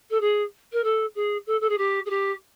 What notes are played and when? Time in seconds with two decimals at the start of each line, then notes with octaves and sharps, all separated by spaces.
0.10 A4
0.20 G#4
0.72 A#4
0.84 A4
1.15 G#4
1.46 A4
1.61 A4
1.69 G#4
1.78 G4
2.06 G#4
2.10 G4